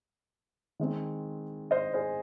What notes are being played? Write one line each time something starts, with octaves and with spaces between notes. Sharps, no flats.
D#3 G#3 C4
C5 D#5
G#4 C5